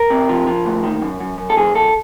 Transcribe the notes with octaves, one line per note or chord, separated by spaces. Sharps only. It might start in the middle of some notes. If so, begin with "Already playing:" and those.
Already playing: A#4
C3
F3
F3
D2
D#3
F#2
F#2
F#2
A4
F#2 G#4
F#2 A4